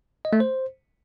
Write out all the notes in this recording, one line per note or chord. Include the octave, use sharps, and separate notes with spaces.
D#5
A3
C5